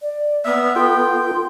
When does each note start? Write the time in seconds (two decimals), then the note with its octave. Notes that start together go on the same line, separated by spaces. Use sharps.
0.02 D5
0.45 B3 E5 F6
0.76 F4 A4 G5 C6